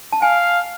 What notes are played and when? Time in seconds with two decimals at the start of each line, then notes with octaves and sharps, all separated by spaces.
0.12 A5
0.22 F5 G#5